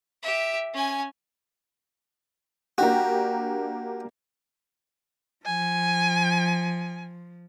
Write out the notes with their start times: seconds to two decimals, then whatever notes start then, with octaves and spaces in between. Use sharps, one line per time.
0.22 G4 E5
0.74 C#4 G#5
2.78 A#3 D4 F#4 G4
5.46 F3 G#5